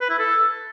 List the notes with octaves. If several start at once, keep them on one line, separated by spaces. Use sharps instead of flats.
B4
E4
A4